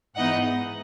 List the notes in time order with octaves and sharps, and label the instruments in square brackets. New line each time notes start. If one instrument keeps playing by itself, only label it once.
[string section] G#2 E3 B3 D#4 D#5 F#5